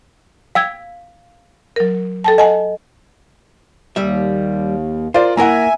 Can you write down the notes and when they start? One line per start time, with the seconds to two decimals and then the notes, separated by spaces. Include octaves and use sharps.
0.55 F5 G5 E6 G#6
1.76 F#3 A#4
2.24 A4 G5 A5
2.38 D#5 F#5 G#5 A5
3.96 D#2 G3 E5
5.14 F4 A#4 C5 D5
5.37 A#3 E4 A#4 E5 F#5 G#5 A#5